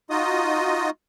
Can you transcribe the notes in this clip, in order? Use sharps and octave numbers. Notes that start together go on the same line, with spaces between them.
D#4 F4 F#4 D#5 D#6